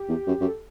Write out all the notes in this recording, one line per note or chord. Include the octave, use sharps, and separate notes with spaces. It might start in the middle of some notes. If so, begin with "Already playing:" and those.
Already playing: G4
E2
F#2
F#2
A4